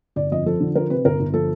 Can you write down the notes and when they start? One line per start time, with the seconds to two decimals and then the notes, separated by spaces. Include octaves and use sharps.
0.16 G1 D5
0.32 F2 D#5
0.46 F3 A4
0.60 D3
0.75 F3 A#4
0.90 C3 B4
1.05 G1 A#4
1.19 G1
1.34 F3 A4